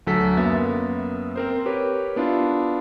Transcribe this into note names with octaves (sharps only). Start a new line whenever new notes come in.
D2 F#3 A4 B6
F#2 A#3 B3 E5 A6
C4 A#4 C5
G4 A#4 B4 C#5
B3 D4 E4 F4